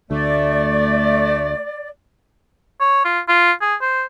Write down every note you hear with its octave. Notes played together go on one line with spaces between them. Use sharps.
D2 A3 D5
C#5
F4
F4
G#4
C5